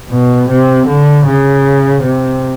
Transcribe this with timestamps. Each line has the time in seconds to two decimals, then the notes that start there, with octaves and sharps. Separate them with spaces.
0.11 B2
0.49 C3
0.87 D3
1.26 C#3
2.02 C3